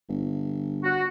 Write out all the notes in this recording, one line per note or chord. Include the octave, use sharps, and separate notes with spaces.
G1
F#4